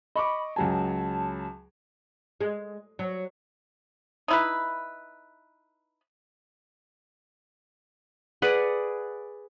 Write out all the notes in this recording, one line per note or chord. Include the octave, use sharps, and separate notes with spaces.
D#5 B5 C#6 D6
C#2 F#3 G#5 A5
G#3
F#3
D#4 E4 B4
G#4 B4 D5 F#5